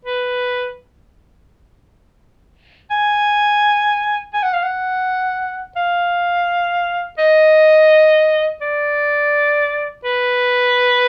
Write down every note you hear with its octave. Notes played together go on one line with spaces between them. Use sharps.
B4
G#5
G#5
F#5
F5
F#5
F5
D#5
D5
B4